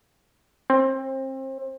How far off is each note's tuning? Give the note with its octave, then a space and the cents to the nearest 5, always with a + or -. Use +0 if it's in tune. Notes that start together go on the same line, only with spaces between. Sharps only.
C4 +30